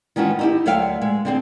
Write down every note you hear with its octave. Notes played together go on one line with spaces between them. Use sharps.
D#3 E3 G#3 C#4 F4 F#4
D#4 E4 G4
D2 F#3 A4 E5 F5 G5
G#3
D3 C4 G#4